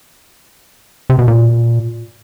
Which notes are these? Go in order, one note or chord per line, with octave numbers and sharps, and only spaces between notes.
C3
B2
A#2